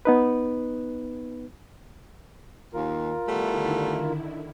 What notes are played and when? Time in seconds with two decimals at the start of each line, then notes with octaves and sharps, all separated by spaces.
0.05 B3 D#4 B4
2.74 D#2 F4 A#4
3.28 D3 D#3 G3 A3 B3 E4